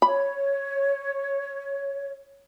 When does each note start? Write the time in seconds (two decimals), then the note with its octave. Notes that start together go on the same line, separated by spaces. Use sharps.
0.02 C#5 B5